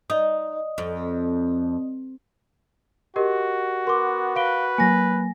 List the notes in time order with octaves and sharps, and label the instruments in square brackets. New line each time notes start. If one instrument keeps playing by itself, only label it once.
[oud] D#4 [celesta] D5 D#5 D#6
[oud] F2
[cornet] F#4 [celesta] G4 A#4 D#5
[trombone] B3 [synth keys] A#4 [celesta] C6 D6
[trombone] B4 [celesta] F5 D7 G7
[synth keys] F#3 A#3 [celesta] G#5 A#6